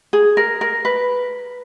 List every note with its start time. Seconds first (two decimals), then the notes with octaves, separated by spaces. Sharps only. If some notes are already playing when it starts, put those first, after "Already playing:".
0.13 G#4
0.37 A#4
0.61 A#4
0.85 B4